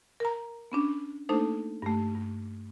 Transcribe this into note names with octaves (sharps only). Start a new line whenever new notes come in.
A#4 A#5
B3 C#4 D4
A3 A#3 D4 D#4 A4 C5
G2 A3
G2